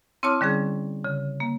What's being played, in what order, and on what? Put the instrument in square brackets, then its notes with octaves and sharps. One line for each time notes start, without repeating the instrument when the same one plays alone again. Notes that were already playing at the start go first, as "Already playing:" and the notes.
[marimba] C4 E4 C#5 A5 D6 F6
D3 G3 C#4 G#4
C#3
A#3